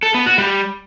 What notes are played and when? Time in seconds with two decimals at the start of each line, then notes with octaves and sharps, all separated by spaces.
0.03 A4
0.14 B3
0.26 F#4
0.38 G3